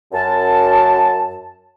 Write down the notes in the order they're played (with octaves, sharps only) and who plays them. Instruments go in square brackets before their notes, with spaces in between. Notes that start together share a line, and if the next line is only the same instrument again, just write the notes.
[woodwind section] F#2 A5